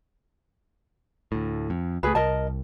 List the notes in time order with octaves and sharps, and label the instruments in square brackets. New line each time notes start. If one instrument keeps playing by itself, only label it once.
[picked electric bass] D2 A2
F2
[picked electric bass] C#2 A3 [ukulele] G#4 B4
[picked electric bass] C2 [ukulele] A#4 D#5 A5